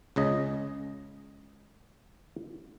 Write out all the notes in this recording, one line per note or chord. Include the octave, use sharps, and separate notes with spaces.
C#2 C#3 D#5